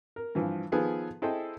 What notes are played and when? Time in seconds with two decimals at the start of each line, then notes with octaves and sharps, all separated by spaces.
0.16 A#4
0.35 G2 E3 F3
0.72 D#3 F3 B3 G#4 A4 B4
1.22 E4 G#4 A4 C5 D#5 G5